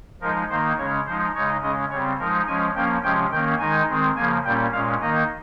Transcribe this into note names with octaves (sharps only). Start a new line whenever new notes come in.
F3 G#3 D#4 A#4
D#3 A#3 D#4 C5
C#3 G#3 C#4 C#5
F3 G#3 D#4 C5
C#3 G#3 D#4 C#5
C#3 G#3 C#4 D#5
C#3 G3 C4 C#5
F3 G#3 D#4 A#4
F3 G#3 C#4 G#5
F3 A#3 C#4 G5
C3 F3 G#3 C#4 G5
D#3 A#3 C#4 G5
D#3 G#3 D#4 G#5
D#3 G#3 C4
C#3 F3 A#3 G#5
A#2 G3 A#3 C#4 G5
A#2 G#3 C#4 F5
D#3 A#3 D#4 D#5